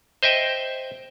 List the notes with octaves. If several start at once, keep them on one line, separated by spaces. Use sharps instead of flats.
C5 D#5 E5 G5